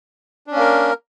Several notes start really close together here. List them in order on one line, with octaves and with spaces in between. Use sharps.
D4 C#4 A#3 A#4